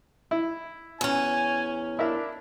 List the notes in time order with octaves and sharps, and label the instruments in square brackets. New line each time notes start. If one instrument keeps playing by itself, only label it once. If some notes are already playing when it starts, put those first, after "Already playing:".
[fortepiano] E4
[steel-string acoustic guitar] E2 C#4 [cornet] G#5
[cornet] D4 [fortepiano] E4 A#4 E5